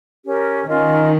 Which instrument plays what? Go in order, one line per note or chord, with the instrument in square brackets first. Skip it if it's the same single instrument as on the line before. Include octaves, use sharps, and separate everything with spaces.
[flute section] C#4 G4 A#4
[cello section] D#3 [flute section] C#4 F4 A#4 D#5